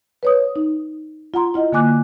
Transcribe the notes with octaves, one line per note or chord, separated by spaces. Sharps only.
B4 C#5 D#6
D#4
F4 F#5 A#5 C6
E4 F4 D#5 F#5
D3 A#3 G#5 D6 F#6